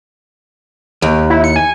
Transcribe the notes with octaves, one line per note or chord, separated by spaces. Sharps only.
D#2
E4
C#7
G#5